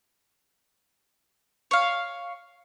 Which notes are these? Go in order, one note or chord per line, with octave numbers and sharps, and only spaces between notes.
C#5 F5